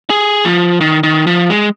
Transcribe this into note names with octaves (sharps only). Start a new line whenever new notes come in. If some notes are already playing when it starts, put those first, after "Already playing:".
G#4
F3
D#3
D#3
F3
G#3